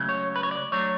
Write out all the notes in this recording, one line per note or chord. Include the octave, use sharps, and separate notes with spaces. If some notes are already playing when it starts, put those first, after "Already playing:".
Already playing: C#2 C#3 F#3 A3
C#5
B4
C#5
D5
F#3 A3 D4 C#5